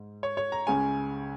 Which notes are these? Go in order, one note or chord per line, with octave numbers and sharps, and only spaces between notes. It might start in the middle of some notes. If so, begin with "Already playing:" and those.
Already playing: G#2
C#5
C#5
A#5
C#2 C#3 G#3 C#4 G#5